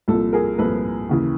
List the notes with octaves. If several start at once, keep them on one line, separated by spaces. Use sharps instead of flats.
C2 A#2 F3 A4
G#4 A#4
C2 A#2 F3 A4 B4
D#2 C#3 E3